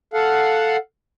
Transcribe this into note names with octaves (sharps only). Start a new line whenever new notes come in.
A4 F5 F#5